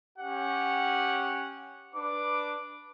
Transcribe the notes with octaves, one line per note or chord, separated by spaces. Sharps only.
C#4 G4 F#5
D4 B4 D6